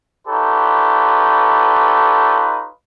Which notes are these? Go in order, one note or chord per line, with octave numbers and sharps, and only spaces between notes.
D#4 F4 G4 A4 B4 C#5